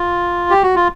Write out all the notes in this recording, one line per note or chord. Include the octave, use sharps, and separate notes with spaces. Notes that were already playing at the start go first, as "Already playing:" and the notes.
Already playing: F4
G4
F#4
F4